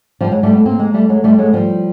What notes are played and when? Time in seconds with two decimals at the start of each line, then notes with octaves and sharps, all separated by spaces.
0.21 F3 G3
0.32 F#3 G#3
0.43 G3 A3
0.54 A3 B3
0.65 A#3 C4
0.79 G#3 A#3
0.94 G3 A3
1.09 F#3 G#3
1.24 G3 A3
1.38 F#3 G#3
1.53 F3 G3